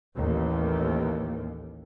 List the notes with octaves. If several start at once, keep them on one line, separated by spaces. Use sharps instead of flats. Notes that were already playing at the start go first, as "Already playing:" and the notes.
A1 D#2